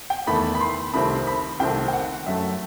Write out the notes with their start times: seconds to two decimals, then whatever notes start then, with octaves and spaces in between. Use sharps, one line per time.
0.10 G5
0.27 E2 D#3 A3 B5
0.55 B5
0.61 C6
0.94 C2 C3 D#3 A3 C4 B5
1.27 B5
1.59 C2 C3 D#3 A3 C4 G5
1.88 G5
1.93 F#5
2.26 F#2 F#3 A3 E5